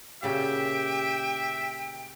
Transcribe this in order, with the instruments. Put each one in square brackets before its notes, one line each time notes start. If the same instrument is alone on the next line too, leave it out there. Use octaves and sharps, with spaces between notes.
[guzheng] A#2 C#3 F#4 [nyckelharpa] G4 [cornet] E5 [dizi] G5